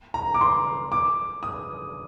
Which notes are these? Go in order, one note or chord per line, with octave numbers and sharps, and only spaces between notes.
A#5
D6
C6
D6
D#6